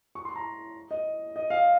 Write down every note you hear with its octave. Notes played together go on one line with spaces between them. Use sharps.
C#6
C6
A#5
D#5
D#5
F5